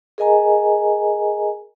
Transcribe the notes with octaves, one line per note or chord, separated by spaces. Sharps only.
G#4 A#4 D#5 G#5 A#5